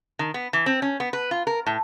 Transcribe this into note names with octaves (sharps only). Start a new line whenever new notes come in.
D#3
B3
E3
C4
C#4
B3
B4
F4
A#4
A2